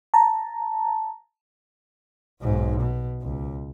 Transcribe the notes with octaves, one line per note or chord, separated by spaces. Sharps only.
A5 A#5
B1 G#2
B2
C#2